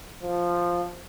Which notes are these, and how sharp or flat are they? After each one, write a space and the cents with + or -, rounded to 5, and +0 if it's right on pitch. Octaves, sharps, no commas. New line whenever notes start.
F3 +0